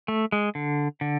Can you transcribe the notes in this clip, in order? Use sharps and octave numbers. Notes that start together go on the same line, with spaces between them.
A3
G#3
D3
D3